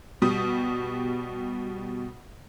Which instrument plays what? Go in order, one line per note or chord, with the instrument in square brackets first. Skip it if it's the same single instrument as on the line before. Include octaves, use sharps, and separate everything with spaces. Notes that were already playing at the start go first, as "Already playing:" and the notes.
[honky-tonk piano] B2 G3 D#6